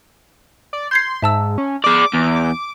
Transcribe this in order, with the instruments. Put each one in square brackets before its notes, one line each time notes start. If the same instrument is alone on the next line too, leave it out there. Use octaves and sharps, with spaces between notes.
[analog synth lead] D5
[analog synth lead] C6 [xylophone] G6 G#6 C7
[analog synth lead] G#2 [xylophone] E5 A5 E6
[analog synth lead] C#4
[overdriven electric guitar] G#4 D5 [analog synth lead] D6
[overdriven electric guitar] E2